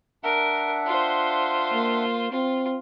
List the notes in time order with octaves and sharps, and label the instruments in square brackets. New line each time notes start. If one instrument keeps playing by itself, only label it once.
[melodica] D4 E5 F#5 [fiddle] A#4
[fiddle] F4 C5
[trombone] A#3
[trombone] C4 [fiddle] F4